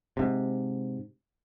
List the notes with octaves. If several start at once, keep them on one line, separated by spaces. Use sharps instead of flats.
G#2 C3